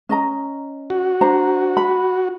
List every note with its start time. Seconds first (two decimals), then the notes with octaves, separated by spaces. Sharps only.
0.09 C#4 D#5 A#5
0.90 F#4
1.21 D4 C5 A#5
1.77 B5